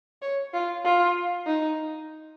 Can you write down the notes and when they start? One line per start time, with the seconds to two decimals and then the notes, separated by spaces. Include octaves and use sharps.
0.22 C#5
0.53 F4
0.84 F4
1.46 D#4